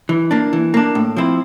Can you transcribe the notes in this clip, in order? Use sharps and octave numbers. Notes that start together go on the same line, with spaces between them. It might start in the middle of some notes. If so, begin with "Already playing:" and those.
E3
A#3 D4
E3
A#3 D4
A2
F3 C4 E4